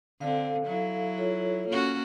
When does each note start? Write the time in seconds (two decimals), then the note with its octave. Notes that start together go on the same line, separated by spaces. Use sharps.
0.21 D3 C4 A4 F5
0.66 F#3 E4
1.18 F4 A4 C#5
1.68 A#3 C#4 F#4